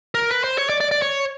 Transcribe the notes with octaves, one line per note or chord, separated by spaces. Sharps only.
A#4
B4
C5
C#5
D5
D5
D5
C#5